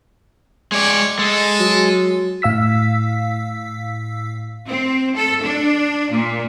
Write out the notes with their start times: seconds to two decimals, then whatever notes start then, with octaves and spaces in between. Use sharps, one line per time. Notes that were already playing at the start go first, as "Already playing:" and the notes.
0.72 G#3 C#5 D5
1.19 G#3 A4
1.59 F#3
2.42 A2 F5 E6 B6
4.68 C4
5.15 A4
5.43 D4
6.11 A#2